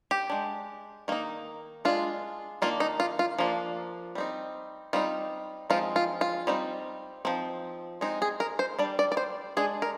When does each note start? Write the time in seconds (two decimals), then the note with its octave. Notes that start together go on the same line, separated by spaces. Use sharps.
0.11 G4
0.30 G#3 D4
1.08 D#3 A#3 D#4
1.85 G#3 D4 F4
2.62 D#3 A#3 D4 F4
2.80 D#4
3.00 F4
3.19 F4
3.38 F3 A#3 D4
4.15 G3 C4 D#4
4.93 G3 C4 D#4 F4
5.70 F3 G#3 C4 D#4 F4
5.96 F4
6.21 F4
6.47 G3 C4 D#4
7.25 F3 C4 D#4
8.01 G#3 C4 D#4
8.22 G#4
8.40 A#4
8.59 C5
8.79 G3 D4 D5
8.99 D5
9.12 D5
9.17 C5
9.57 G#3 D4 G#4
9.82 A#4